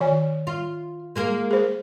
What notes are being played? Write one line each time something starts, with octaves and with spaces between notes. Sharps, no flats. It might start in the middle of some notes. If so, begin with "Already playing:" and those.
D#3 C#5 G#5
F4
G#3 A#3 A#4
G#4 C5